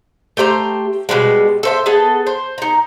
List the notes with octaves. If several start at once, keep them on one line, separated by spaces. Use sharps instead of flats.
A3 G4 C5 A#5
B2 E3 G3 G#3
A4 C5 E5
B3 G#4 A4
C5
D#4 A#5